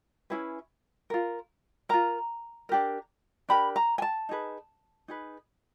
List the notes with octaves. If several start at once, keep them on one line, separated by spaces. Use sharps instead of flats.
C#4 E4 G#4 B4
F4 A#4
F4 A#4 A#5
D4 G4 A#4
D4 G4 A#4 B5
A#5
G#5
A5
D#4 G#4 B4
D#4 G#4 B4